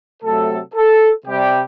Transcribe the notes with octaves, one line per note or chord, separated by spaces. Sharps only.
C3 F#3 A3 A4
A4
C3 G3 G4